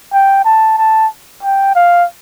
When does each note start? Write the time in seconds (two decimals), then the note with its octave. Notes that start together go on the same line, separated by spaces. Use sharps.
0.13 G5
0.45 A5
0.78 A5
1.43 G5
1.75 F5